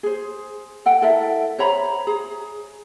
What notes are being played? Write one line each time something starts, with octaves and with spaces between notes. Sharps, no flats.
G#4 C5
A4 F#5 G5
E4 A4 A#4 E5
C5 C#5 A#5 B5
G#4 A#5